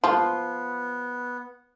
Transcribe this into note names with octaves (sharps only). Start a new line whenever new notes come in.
F3 B3 C6